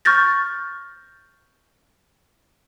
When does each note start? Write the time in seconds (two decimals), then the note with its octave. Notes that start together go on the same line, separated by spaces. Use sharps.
0.05 C#6 F6 G6 A6 A#6